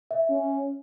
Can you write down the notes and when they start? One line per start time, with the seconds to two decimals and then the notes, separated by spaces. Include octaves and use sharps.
0.11 E5
0.30 C#4